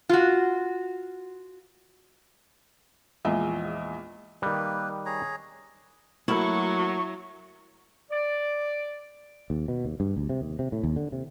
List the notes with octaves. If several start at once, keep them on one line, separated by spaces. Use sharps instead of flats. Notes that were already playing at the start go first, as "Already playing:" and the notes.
F4 F#4
A#1 E2 G#3 F4 D#5 E5
D#3 G3 A#3 B4
G#4 C#5 A#5
F#3 A3 A#3 E4 F#4 C#6
D5
D#2
B2
D#2
G2
D2
C3
D#2
C3
A2
D#2
D3
C3